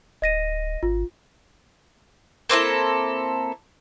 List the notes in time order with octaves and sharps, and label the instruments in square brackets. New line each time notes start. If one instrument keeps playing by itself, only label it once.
[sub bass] D1 [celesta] D#5 A#6 D#7
[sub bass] G#1 [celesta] F4
[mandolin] A#3 C4 E4 A4